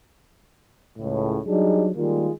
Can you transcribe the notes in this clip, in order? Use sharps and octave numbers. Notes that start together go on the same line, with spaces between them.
C#2 A2
F#3 G3 D4 D#4 G#4
D#3 G3 G#3 A#3 F4